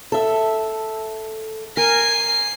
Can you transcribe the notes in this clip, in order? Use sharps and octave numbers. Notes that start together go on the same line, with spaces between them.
A4 E5
A#4 G#5 C7